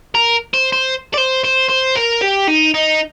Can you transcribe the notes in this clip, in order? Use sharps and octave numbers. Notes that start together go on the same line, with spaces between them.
A#4
C5
C5
D5
C5
C5
C5
A#4
G4
D#4
D#4